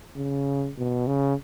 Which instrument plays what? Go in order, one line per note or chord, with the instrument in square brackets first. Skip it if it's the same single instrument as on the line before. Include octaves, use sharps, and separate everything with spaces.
[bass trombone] C#3
B2
C#3